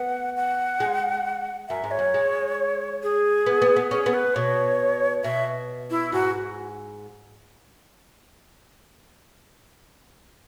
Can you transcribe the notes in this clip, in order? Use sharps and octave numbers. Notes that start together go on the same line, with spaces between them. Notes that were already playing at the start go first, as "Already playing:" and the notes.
Already playing: B3 F#5
F#5
G#3
F#2 E5
G#2
C#5
F#2
G#3
G#4
B3
B3
B3
C#4 G#4
B3
B4
B2 C#5
B2 E5
E4
G#2 F#4